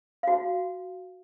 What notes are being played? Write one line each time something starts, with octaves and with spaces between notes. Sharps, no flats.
F#4 F5